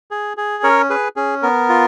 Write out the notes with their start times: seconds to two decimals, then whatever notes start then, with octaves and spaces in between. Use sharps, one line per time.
0.11 G#4
0.37 G#4
0.63 C#4 A#4 C#5
0.90 G#4 B4
1.16 C#4 G#4
1.42 B3 A#4
1.69 F4